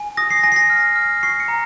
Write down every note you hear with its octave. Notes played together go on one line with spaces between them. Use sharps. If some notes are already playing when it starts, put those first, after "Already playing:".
Already playing: G#5
D#6 A#6
C7
G#5 A#6
C7
A#6
F6
F6
C#6 C7
C#7
A#5